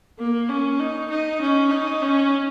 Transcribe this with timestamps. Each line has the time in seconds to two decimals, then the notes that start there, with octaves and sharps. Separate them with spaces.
0.19 A#3
0.49 C#4
0.80 D#4
1.11 D#4
1.42 C#4
1.72 D#4
2.03 C#4